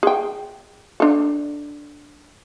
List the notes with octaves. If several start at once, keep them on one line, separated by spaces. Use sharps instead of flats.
G#4 G5
D4 A4